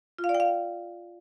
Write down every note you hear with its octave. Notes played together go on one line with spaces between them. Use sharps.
F4
F5
D5
G5
F5